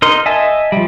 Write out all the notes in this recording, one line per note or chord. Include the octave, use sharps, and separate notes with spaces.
D#4 A#4 C6
D#5 E5 G#5 A5
F3 G3